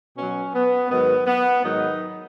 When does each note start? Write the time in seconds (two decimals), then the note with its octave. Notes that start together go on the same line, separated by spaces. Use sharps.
0.17 B2 F#3 C#4
0.54 B3
0.90 G#2 D#3 F#3 B3
1.27 B3
1.63 G#2 D#3 F#3 D#4